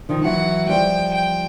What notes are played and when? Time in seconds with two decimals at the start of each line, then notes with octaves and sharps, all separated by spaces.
0.09 D#3 F3
0.24 E3 F#3 F#5
0.69 F3 G3 G5
1.14 G5